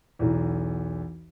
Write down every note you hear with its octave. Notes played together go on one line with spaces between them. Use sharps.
B1 E2